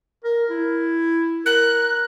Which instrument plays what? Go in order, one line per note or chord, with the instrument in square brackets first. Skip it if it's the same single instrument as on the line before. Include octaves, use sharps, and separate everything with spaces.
[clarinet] A#4
E4
[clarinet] A#4 [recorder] F#6